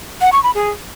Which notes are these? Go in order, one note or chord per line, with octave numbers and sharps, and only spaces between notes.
F#5
C#6
B5
G#4